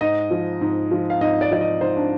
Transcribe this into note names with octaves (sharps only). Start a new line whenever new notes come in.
G#2 D#5
F3
G#2
F3
F5
G#2 D#5
D5
F3 D5
D#5
G#2 C5
D4